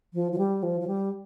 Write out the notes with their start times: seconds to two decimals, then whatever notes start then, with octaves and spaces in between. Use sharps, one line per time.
0.14 F3
0.32 F3
0.38 G3
0.63 F3
0.81 F3
0.87 G3